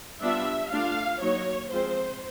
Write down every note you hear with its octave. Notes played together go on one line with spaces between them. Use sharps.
G3 B3 D4 F4 E5
A3 D4 F4 F5
F#3 A#3 D#4 C#5
F3 G#3 C4 C5